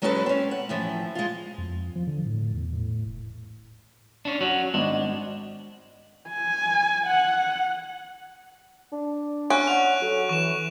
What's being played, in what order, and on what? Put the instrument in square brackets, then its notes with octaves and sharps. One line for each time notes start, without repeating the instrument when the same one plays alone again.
[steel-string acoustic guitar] F#3 G#3 C#4 E4 A4 B4
C4 C#4
F#5
A2 E3 F3
G#3 F4
[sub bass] F2
F3
D3
A2
E2
A2
E1
[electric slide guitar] C#4 D4
F#3 C#4 F#4
[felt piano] G#1 D#5 [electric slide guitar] D4
[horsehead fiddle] G#5
F#5
[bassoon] D4
[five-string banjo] C#4 [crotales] C#6 F#6 D7
[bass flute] F#5 [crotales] F7
[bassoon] F#3 [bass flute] A4
[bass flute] E3 [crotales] C#6 E7